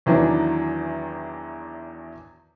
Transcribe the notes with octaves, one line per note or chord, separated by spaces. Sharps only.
E2 D#3 E3 F#3 D4